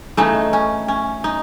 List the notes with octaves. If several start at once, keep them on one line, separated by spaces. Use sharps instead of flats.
C#3 E3 A3 D#4
C#4
C#4
D#4